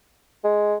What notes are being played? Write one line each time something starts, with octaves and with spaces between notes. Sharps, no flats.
G#3